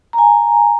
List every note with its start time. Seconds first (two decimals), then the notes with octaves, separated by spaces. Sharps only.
0.13 A#5
0.18 G#5